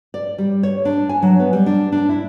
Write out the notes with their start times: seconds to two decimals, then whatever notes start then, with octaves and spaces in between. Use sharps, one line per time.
0.14 D5
0.38 G3
0.63 C#5
0.85 D4
1.09 G#5
1.22 F#3
1.39 B3
1.53 G3
1.66 D4
1.92 D4
2.09 E4